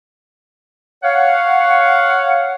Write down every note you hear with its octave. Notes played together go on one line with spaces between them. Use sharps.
C#5 F5 F#5